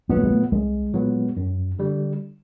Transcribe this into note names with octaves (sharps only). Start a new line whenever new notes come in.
A#2 F#3 A#3 B3
A3
G#3
A3
C2 G#3
A#2 F#3 B3
F#2
D3 G3